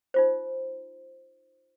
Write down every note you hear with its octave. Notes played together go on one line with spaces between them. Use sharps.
D#4 F4 C5